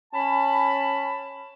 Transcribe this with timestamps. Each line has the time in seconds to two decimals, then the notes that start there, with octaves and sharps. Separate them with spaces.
0.14 C#4 A5 B5